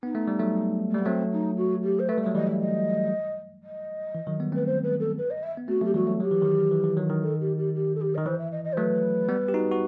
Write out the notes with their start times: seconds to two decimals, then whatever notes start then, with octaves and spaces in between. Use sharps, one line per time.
0.03 B3 D#4
0.15 A3
0.28 G3
0.39 F#3 A3
0.90 A3
0.94 G3 B3
1.05 F#3 A3 C4
1.32 D#4
1.56 F#4
1.83 G4
1.99 C5
2.08 A3 B4
2.18 G3
2.22 E5
2.26 F#3
2.35 E3 G3 D#5
2.47 E5
2.60 D#5
3.63 D#5
4.14 E3
4.27 D#3 F#3
4.40 G3 B3
4.52 A3 C4
4.55 B4
4.66 C5
4.83 B4
5.00 A4
5.18 B4
5.30 D#5
5.42 E5
5.57 B3
5.68 A3 C4 F#4
5.81 F#3 A3
5.84 G4
5.94 E3 G3 F#4
6.07 F#3 A3
6.20 F#3 G4
6.31 E3
6.42 D#3 F#3
6.71 E3
6.84 E3
6.97 D#3 F#3
7.10 D#3
7.22 A4
7.40 G4
7.57 G4
7.74 G4
7.95 A4
8.01 G4
8.15 D#3 D#5
8.26 E3 C5
8.38 E5
8.51 D#5
8.64 D#5
8.72 C5
8.77 F#3 A3 B4
9.29 G3 B3
9.49 G4
9.54 D#4 F#4
9.72 F#4